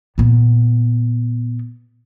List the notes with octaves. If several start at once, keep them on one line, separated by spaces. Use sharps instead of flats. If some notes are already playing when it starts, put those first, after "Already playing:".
A#2 B3